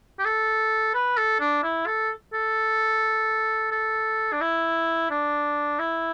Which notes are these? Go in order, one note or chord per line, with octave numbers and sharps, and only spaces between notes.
G4
A4
B4
A4
D4
E4
A4
A4
A4
D4
E4
D4
E4